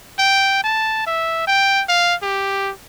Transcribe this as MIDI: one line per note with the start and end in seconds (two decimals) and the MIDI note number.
0.19 0.62 79
0.64 1.05 81
1.07 1.47 76
1.47 1.84 79
1.89 2.15 77
2.22 2.72 67